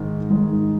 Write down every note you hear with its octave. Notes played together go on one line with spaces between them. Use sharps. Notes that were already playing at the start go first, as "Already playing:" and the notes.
Already playing: G#2 D#3 G#3
G#2 D#3 G#3